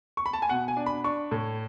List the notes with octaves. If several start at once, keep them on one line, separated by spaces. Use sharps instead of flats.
C#6
B5
A5
G#5
B2 F#5
G#5
D4
B5
D4 C#6
A2